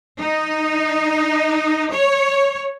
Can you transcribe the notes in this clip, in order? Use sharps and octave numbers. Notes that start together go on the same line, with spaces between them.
D#4
C#5